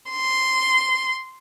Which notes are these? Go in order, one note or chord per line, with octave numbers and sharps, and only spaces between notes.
C6